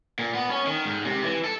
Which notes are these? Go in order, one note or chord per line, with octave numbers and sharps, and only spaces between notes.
A#2
B3
C#4
D#3
G#2
C3
E3
A4